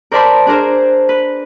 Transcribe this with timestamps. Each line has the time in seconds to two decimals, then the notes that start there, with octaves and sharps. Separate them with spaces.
0.12 A#4 C5 D5 A5 B5 C6
0.47 D4 G#4 A#4 C5
1.09 B4